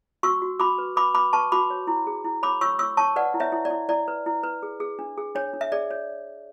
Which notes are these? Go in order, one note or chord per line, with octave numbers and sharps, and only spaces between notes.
F#4 C#6 E6
F#4
F#4 B5 D6
B4
B4 B5 D6
B4 B5 D6
B4 A5 C#6
F#4 B5 D6
C#5
E4
G#4
E4
C#5 B5 D6
C#5 C#6 E6
C#5 C#6 E6
C#5 A5 C#6
B4 D5 F#5
E4
C#5 E5
E4
D5
E4
E4 D5
B4
E4
B4
G#4
G#4
D4
G#4
D4 C#5
D4
E5
G#4 D5
C#5